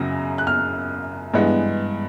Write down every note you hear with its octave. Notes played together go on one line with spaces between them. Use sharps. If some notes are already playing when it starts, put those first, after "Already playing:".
Already playing: F#2 C#3 F#3 A#6
F#6
F6
G2 E3 G#3 B3